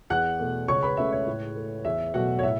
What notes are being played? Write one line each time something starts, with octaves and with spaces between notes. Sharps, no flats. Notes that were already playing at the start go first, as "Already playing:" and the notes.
E2 F#5 F#6
B2 A3
C#2 C#5 C#6
B4 B5
C#3 A3 E5
C#5
A2
A3
E2 E5
B2 F#3 A3 F#4 F#5
C#5
A2 E5